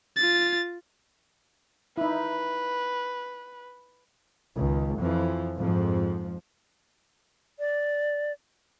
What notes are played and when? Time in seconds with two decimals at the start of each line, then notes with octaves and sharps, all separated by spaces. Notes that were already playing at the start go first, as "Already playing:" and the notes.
0.17 F4 A6
1.98 D#4 E4 B4
4.55 C#2 D#3
4.99 F2 E3 F3
5.56 F2 G#2 F3
7.59 D5